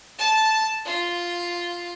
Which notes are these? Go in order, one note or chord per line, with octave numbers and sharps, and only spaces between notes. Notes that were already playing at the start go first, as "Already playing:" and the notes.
A5
F4